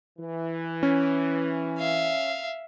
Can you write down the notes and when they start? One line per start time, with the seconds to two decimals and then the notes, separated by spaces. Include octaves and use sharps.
0.19 E3
0.83 C#4
1.79 E5 F5